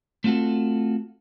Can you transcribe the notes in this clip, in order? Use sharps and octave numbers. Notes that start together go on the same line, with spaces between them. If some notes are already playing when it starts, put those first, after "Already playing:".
A3 C4 F4 F#4 A4